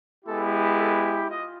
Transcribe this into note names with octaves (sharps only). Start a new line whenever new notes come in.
G#3 B3 E4 G4 A4
A4
F4 D#5